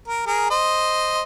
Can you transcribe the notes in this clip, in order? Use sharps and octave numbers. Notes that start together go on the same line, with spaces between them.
A#4
G#4 A#4
C5 D#5